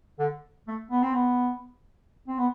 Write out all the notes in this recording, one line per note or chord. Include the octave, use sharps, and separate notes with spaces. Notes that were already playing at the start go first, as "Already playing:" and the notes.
D3
A3
B3
C4
B3
C4
B3